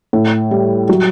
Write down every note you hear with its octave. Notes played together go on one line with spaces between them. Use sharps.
A2
G3
F#3